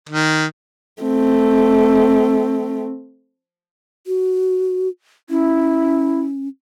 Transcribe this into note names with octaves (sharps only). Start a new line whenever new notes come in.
D#3
A3 C4
F#4
C#4 E4